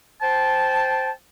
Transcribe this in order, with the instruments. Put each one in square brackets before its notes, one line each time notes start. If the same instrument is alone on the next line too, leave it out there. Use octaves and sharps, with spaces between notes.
[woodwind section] C5 G5 A5